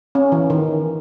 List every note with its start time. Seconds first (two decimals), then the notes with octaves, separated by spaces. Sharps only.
0.15 C#4
0.32 E3
0.50 D#3